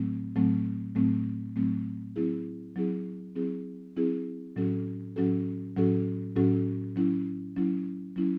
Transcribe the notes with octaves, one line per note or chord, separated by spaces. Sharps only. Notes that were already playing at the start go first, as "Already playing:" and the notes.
Already playing: A2 F#3 A3 C4
A2 F#3 A3 C4
A2 F#3 A3 C4
A2 F#3 A3 C4
F#3 C4 E4 G#4
F#3 C4 E4 G#4
F#3 C4 E4 G#4
F#3 C4 E4 G#4
A2 F#3 C#4 F#4 A4
A2 F#3 C#4 F#4 A4
A2 F#3 C#4 F#4 A4
A2 F#3 C#4 F#4 A4
F#3 C#4 E4
F#3 C#4 E4
F#3 C#4 E4